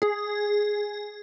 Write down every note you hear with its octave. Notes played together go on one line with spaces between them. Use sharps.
G#4